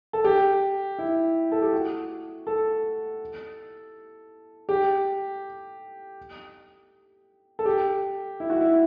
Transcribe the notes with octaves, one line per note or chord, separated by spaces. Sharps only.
A4
G4
E4
A4
G4
F#4
A4
G4
A4
G4
E4
F#4
E4